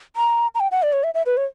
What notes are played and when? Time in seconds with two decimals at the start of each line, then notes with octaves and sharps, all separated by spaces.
0.16 A#5
0.55 A#5
0.60 G5
0.71 F#5
0.83 D5
0.93 C#5
1.04 E5
1.14 E5
1.26 B4
1.37 C#5